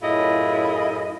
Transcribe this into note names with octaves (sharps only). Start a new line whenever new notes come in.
F#2 A2 E4 F4 G#4 D#5